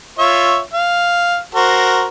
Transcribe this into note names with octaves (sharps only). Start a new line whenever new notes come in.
F4 C#5 E5
F5
F#4 A#4 C5